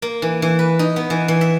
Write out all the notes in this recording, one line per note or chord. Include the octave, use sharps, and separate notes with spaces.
A#3
E3
E3
B4
D#4
B3
E3
E3
E5